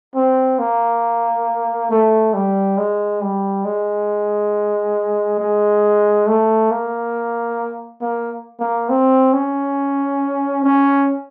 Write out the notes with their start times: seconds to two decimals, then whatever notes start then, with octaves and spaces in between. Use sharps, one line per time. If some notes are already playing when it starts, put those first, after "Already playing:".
0.15 C4
0.59 A#3
1.91 A3
2.34 G3
2.78 G#3
3.21 G3
3.65 G#3
5.40 G#3
6.27 A3
6.71 A#3
8.01 A#3
8.60 A#3
8.90 C4
9.33 C#4
10.64 C#4